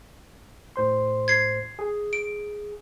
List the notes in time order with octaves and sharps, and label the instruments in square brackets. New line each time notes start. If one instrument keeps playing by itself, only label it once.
[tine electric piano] A2 C5 C6
[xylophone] G#6 C7
[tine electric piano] G#4
[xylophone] D7